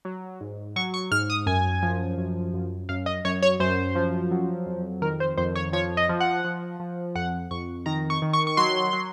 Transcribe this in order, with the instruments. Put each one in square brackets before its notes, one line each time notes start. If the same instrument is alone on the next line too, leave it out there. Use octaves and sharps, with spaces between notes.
[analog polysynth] F#3
G#2
F#3 C#6
C#6
G#2 F6
D#6
F#2 G#5
F3
F#2
F#2
F#2 F5
D#5
F#2 C#5
C#5
F#2 C5
F3
F#3
F2
D#3 A#4
C5
F2 C5
C#5
F3 C#5
D#5
F3
F#5
F3
F3
F2 F#5
F2 C#6
D#3 A#5
C#6
D#3
C#6
C#6
F#3 C6
F#3